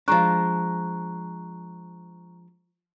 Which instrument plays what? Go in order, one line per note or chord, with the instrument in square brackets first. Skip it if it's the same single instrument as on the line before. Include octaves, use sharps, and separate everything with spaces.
[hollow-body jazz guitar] F3 G#3 D4 [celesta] A#5 C#6 F#6